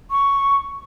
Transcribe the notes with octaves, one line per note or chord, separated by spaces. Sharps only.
C#6